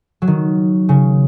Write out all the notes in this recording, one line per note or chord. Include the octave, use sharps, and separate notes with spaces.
F#3
D#3
C#3